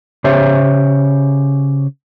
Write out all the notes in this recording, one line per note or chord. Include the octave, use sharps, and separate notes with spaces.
C#3 G4 C5 C#5 E5